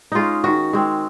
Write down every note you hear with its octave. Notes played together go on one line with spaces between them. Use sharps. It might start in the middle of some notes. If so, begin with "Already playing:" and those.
G#3 C#4 D#4 F4
D#3 F#4
G#3 C4